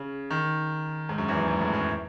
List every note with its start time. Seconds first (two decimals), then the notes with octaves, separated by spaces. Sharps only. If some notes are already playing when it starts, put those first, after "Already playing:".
Already playing: C#3
0.31 D#3
1.09 G#2
1.18 F#2
1.28 E2
1.38 F#2
1.48 G#2
1.61 A2
1.73 F#2